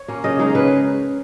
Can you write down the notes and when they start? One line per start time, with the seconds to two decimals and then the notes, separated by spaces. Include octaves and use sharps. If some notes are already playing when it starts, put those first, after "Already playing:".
Already playing: C#5
0.08 A#3 C#4
0.24 C#3 D#5
0.39 G#3 D#4
0.55 C#3 B4